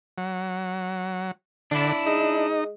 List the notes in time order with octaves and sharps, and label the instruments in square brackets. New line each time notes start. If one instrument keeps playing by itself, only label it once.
[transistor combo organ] F#3
[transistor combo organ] D3 [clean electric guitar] D4 E4
[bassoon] G#3 [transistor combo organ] D#4